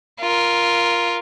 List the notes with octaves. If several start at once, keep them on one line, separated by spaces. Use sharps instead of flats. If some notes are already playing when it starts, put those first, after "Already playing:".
F4 A#4